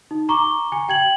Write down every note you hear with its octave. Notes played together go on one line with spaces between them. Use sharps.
D#4
A#5 C#6 D6 G7
G#5
G5 G#6 F#7